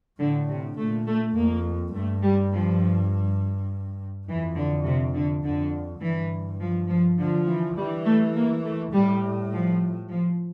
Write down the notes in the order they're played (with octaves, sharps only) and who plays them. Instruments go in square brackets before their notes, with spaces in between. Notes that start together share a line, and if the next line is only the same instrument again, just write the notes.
[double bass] A2 [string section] D3
[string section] C3
[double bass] A#2 [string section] A3
[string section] A3
[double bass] F2 [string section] A#3
[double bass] G2 [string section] A3
[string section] G3
F3
[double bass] F2 [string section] E3
[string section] D3
C3
D3
[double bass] F2 [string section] D3
[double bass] G2 [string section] E3
[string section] F3
F3
[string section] D3 [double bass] F3
[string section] E3
[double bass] E3 [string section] G3
[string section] A3
A#3
A3
[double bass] A2 [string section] G3
[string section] F3
F3